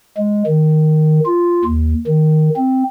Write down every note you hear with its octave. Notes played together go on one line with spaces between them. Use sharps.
G#3
D#3
F4
D#2
D#3
C4